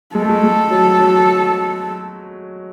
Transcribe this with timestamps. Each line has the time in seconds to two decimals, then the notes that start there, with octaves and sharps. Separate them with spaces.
0.15 G#3 A4
0.22 A3
0.29 G#3
0.43 G#3
0.71 F#3
0.99 F#3